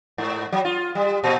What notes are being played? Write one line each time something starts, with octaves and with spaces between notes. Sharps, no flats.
G#2
F#3
F4
G3
A#2